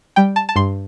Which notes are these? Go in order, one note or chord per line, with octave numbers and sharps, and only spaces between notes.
G3 G5
A5
A5
G2 C6